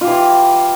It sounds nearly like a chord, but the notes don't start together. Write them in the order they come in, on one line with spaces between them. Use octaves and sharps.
F4 G4 E3 E4